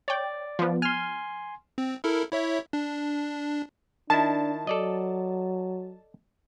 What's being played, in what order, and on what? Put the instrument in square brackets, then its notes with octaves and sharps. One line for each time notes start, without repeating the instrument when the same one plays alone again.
[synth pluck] C#5 G5 [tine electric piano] D5
[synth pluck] F3 B3
[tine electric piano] G#5 C6 [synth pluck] F6
[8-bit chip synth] C4
E4 A4 A#4
E4 C#5 E5
D4
[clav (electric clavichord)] D#3 E4 [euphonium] D4 [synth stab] A5
[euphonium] F#3 [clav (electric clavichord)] A4 D5 D#5